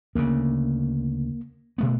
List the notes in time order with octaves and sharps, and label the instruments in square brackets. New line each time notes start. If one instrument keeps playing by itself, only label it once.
[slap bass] D2 C#3 [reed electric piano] A#3
[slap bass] B2 A3 B3